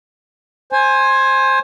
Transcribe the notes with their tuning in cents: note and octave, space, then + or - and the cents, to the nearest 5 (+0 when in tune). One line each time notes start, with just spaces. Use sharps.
C5 +20 G#5 +0